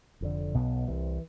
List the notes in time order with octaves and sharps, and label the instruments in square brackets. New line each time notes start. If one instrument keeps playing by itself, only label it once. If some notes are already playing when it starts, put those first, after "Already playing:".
[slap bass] F1 F2 D3
B1 B2 B3
C2 C3 E3